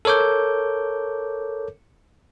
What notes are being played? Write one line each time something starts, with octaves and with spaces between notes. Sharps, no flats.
A4 A#4 C#5 D6 G6